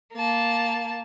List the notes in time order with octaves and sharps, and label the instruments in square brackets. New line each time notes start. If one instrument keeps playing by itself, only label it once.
[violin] A#3 A5